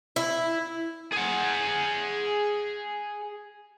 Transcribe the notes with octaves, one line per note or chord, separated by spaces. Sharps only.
E4
G#4 F#5